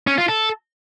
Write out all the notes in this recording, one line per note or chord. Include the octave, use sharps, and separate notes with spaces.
C#4
F4
A4